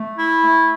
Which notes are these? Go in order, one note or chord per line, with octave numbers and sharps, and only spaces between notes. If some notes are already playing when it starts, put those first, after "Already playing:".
Already playing: A3
E4
A3